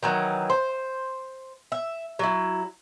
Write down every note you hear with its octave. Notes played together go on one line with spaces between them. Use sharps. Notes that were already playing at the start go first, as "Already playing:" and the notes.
D#3 E3 F#3
C5
E5
F#3 E4